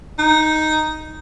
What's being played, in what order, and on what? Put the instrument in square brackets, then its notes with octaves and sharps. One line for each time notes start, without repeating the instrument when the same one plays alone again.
[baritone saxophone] D#4